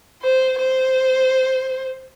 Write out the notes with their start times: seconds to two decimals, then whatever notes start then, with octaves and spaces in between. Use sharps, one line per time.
0.23 C5
0.59 C5